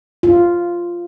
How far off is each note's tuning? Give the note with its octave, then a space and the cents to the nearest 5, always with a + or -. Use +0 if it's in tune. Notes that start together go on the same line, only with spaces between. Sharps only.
F4 -5